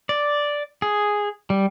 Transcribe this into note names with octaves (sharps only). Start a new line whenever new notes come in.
D5
G#4
G3